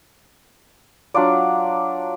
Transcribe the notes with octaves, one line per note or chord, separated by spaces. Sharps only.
F#3 D4 F4 D5